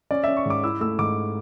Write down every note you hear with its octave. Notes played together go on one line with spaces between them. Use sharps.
C#4 D5
C#4 E5
C#6
G#2 D6
E4 E6
A3 E6
G#2 D6